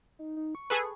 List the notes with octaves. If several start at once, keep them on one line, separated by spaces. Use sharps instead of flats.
D#4
D#4
C#6
G#4 A4 B4